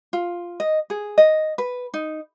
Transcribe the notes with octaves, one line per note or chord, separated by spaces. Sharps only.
F4
D#5
G#4
D#5
B4
D#4